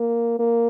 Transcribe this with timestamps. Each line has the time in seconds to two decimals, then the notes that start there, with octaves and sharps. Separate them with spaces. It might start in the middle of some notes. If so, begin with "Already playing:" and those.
Already playing: A#3
0.39 A#3